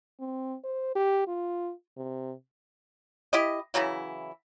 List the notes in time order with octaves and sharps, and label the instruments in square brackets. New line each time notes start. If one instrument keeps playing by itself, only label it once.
[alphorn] C4
C5
G4
F4
C3
[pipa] E4 G4 D#5
C#3 E3 F#3 E4